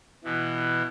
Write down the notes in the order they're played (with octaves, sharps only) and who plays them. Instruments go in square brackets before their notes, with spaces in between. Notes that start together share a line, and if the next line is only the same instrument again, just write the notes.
[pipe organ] B2 E3